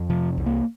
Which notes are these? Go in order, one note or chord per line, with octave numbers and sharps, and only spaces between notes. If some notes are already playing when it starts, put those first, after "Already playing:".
Already playing: F2
C3 F3
C2
A#3